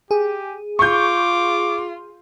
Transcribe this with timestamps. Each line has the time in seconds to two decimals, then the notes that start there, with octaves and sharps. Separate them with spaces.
0.11 G4 G#4
0.79 F4 C#6 D6 G6